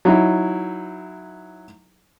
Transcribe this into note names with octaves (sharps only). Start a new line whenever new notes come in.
F#3 D#4 E4